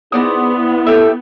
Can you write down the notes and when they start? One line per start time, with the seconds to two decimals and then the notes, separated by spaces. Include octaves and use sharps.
0.12 B3 C4 D#4 E4 G#4 D5 D#6
0.56 E4
0.87 G4 A4 E5